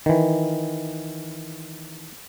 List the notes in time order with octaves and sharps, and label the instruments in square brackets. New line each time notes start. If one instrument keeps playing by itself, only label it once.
[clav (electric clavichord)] D#3 E3